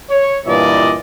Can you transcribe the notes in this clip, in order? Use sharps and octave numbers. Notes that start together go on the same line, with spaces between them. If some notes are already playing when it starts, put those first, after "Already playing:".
C#5
G2 A#2 E3 F4 D5 D#5